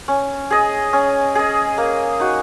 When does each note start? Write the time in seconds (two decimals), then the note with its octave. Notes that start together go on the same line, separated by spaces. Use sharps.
0.08 C#4
0.51 G#4 D#5
0.93 C#4
1.35 G#4 D#5
1.78 A#3
2.20 D#4 F#4